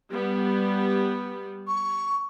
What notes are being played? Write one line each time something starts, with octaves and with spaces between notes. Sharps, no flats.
G3 B3
C#6